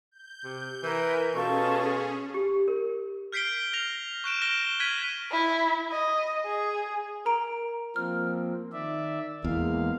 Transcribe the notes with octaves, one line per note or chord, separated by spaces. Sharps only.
G6
C3
E3 E4 A#4 G#5
B2 C#4 F4 G#4 A4 C#6
G4
A#4
F6 G6 B6 C7 D7 G7
F6 A#6 F7
C#6 F#6 D7 E7
F6 A#6 D7 E7 G7
F6 F#6 G#6 B6 D#7 F#7
E4
D#5
G#4
A#4 A#5 D7
F3 A#3 C4 F6
D#3 D5 E5
E2 G#3 A#3 F5